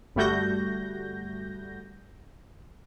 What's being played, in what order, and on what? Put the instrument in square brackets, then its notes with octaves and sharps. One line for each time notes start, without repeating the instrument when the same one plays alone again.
[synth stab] G1 G3 A3 F#4 G6 A#6